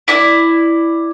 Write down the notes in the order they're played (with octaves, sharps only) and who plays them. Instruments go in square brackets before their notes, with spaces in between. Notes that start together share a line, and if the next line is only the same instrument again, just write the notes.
[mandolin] E4 D5